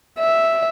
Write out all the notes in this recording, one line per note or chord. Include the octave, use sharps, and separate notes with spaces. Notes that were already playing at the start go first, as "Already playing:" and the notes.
E5